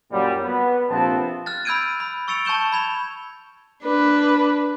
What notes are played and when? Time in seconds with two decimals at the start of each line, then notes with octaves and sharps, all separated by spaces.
0.12 F#2 A#2 F#3 G3
0.43 B3
0.90 A#1 C3 F3 B3 C4 A5
1.46 F6 F#6 A6
1.65 B5 E6 G6 G#6 D7 D#7
2.00 B5
2.28 C#6 E6 A6 C#7 D7 F7
2.45 A5 C#6 G6 E7 G7
2.73 B5 G#6 F7
3.83 D4 B4